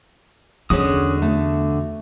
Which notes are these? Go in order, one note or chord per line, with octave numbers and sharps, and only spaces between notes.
E2 D3 G#3 C#4 F#4 D#6
A3